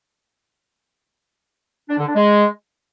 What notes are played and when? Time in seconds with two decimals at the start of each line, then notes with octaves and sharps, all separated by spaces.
1.89 D4
1.98 D3
2.07 D4
2.15 G#3